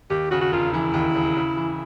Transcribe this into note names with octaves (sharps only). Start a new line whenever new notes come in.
D#2 G4
C#3 F#4
F#4
E1 F4
E3 E4
D#2
C#3
C#3
E3